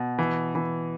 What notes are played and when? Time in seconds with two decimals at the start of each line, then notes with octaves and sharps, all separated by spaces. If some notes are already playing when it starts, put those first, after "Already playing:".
Already playing: B2
0.19 E3
0.55 E3